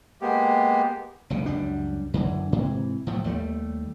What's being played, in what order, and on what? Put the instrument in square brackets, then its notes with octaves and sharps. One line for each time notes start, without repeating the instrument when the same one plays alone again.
[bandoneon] G#3 A#3 B3 G4
[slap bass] F#1 C#2 C#3
C#2 F#2 G3 D4
F#2 D3 E3
G#2 C3 E3
A2 F3 F#3
D#2 G3 A3